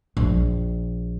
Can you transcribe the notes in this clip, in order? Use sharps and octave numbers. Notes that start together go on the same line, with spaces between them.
A#1